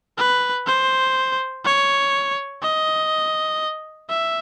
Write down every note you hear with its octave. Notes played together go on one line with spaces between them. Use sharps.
B4
C5
C#5
D#5
E5